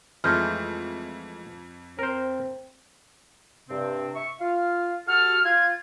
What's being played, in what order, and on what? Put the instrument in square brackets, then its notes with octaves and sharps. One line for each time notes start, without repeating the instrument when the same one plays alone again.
[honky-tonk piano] F2 [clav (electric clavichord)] E3 G#3 A3 [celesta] F6 G6
[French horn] C4 [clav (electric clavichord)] A#4 C5
[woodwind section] G2 C3 C4
E5 C#6
F4 F5
[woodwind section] F#4 G4 A4 [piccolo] F6
[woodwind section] F4 [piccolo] G#6